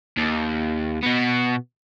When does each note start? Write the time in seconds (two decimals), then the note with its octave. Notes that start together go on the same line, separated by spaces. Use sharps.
0.17 D#2
1.03 B2 B3